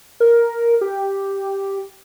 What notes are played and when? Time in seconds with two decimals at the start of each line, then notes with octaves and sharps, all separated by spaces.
0.20 A#4
0.81 G4